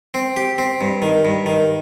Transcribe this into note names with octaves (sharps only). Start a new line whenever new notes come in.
C4
G4
C4
G2
D#3
G2
D#3